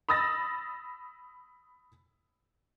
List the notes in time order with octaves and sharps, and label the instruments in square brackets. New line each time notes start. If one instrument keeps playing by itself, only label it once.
[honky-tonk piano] B5 D#6 E6 A6 A#6